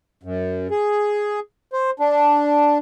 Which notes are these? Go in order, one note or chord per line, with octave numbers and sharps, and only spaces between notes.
F#2
G#4
C5
D4